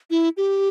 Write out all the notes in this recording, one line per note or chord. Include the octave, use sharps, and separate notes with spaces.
E4
G4